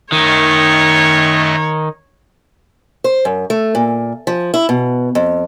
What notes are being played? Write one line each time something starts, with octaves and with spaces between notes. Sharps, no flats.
F#2 D#3 A3 C#5 D#5
C5
F#2
A3
A#2
F3
E4
B2
F2